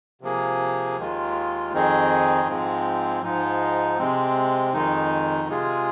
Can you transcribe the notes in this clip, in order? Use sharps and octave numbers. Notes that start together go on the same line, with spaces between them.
C3 F3 A#3 G#4
D#2 D#3 G#3 F4
F2 D#3 C4 D#4 G#4
G#2 F3 G#3 C4
G#2 F3 G#3 D#4
C3 G#3 C4
F2 D#3 G#3 D#4
C3 G#3 F4 G#4